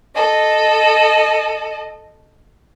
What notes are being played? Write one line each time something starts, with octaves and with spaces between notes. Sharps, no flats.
A4 D#5